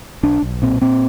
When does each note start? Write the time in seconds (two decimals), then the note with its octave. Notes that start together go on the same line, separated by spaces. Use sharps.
0.23 B1 D4
0.43 B1
0.62 A#2 C4
0.82 A#2 C4